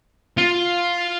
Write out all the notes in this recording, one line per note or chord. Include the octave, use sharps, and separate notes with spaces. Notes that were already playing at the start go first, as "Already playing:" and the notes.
F4